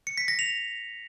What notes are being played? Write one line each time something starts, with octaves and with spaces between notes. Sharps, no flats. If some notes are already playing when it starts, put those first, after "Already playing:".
C#7
B6
A#6
F7